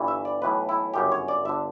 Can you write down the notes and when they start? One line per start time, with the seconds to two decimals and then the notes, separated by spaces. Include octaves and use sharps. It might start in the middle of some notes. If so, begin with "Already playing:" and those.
Already playing: G1 G2 E3
0.08 E5
0.25 D5
0.42 B1 A2 E3 B4
0.69 E4
0.94 G1 F#2 C#3 G4
1.12 C#5
1.28 D5
1.45 G1 D3 E5